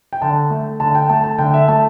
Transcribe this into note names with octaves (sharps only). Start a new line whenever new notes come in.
G5
D3 A5
A3
D3 A5
G5
A3 A5
A5
D3 G5
E5
A3 A5